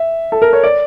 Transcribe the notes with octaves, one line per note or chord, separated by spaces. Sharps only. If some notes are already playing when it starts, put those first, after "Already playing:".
Already playing: E5
A4
A#4
C#5
D5